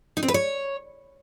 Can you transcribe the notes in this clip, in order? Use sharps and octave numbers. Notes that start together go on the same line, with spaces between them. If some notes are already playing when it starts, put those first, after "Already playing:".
D#4
C4
B4
C#5